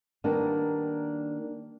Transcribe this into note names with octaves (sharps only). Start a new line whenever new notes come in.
D#3 G3 A#3 B3 D4